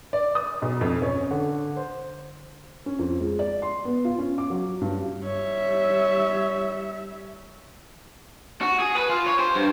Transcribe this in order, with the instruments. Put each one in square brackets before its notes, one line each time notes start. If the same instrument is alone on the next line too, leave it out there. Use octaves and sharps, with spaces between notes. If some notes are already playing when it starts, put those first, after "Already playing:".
[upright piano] D5
D#6
B1
F2
C#4
D3
C5
[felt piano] C#4
F2
G#3
D5
C6
B3
F4
C#4
D6
F#3
G2
[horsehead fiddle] G3 E5 [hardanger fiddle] C#5
[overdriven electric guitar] F#4
G#4
B4
F4
C#5
C5
G2